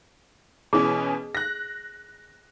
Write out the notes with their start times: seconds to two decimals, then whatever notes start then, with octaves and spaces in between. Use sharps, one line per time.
0.73 B2 E3 C#4 G#4
1.35 F#6 A#6